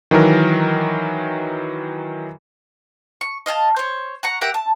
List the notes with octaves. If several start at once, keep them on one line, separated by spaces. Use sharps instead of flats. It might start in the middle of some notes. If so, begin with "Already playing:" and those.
D#3 E3 F#3 A#4
C#6
D#5 F5 G#5 A5
C5 C#5
F#5 A#5 C#6
G4 A#4 E5 F#5
A5